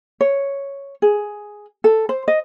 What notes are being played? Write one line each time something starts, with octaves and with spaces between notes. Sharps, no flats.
C#5
G#4
A4
C5
D#5